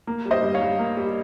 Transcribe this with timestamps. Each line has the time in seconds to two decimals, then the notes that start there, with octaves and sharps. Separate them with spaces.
0.07 A#3
0.25 G3
0.31 C5 D#5
0.42 G2
0.54 C#5 F5
0.62 G2
0.79 A#3
0.97 G3